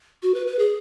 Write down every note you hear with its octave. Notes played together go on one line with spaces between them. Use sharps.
F#4
B4
B4
G#4